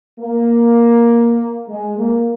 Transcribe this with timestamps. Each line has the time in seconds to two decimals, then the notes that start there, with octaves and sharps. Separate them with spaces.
0.20 A#3
1.68 G#3
1.98 A#3